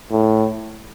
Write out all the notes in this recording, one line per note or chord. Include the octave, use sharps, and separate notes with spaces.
A2